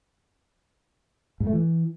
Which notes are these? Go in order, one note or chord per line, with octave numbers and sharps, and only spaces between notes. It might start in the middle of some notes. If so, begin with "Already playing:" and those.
G#2
A3
E3